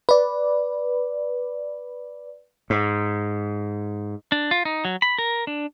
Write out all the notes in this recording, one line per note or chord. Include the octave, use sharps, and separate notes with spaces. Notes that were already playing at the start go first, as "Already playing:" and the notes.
B4 D5
G#2
D4
F4
D#4
F#3
B5
A#4
D4